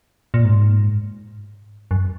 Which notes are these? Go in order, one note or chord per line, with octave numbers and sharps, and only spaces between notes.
A#2
G#2
F#2